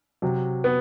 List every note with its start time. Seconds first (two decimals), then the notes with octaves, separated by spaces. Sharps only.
0.22 C3 F#3
0.64 B3